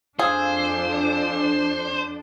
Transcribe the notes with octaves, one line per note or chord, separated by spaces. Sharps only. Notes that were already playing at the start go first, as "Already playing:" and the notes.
F2 D4 G#4 C5 F5 G#5 E6